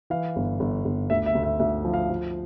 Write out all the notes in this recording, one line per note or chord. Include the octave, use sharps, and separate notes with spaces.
E3 F5
G1
G1
G1
D2 E5
E5
D2
E5
D2 E5
F3
F5
F3